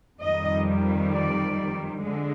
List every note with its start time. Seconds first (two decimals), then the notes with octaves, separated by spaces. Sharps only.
0.21 F2 D#3 G3 D#5
1.12 D5
2.02 D3 G#3